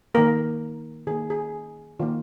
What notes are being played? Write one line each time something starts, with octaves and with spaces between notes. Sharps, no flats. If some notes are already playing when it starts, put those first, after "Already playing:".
D#3 A#3 A#4
D#3 A#3 G#4
G#4
D#3 A#3 F4